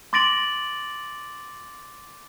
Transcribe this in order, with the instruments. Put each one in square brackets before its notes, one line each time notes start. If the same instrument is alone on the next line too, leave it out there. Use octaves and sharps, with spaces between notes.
[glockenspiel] C6 D6 A6 A#6 D7 F#7